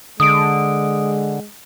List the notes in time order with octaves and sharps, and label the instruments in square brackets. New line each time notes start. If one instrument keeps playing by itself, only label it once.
[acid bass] D3 [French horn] G#3 [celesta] D#6 D7